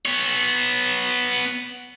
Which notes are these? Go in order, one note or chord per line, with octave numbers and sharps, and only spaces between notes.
B3 C#5